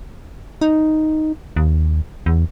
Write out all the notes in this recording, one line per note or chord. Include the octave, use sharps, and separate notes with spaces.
D#4
D#2
E2